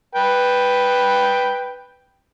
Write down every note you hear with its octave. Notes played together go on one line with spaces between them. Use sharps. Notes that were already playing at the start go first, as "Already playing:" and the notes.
B4 G5